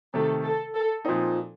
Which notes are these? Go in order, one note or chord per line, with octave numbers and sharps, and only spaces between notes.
C3 D#3 A3 A4
A4
A4
A#2 F3 C4 D#4